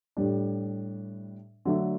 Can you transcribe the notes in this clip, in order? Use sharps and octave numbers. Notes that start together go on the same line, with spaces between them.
A2 G3 D4
D3 F#3 A3 D4